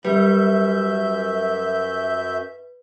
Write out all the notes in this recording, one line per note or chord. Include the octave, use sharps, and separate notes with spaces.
F#2 G3 B4 E5 G6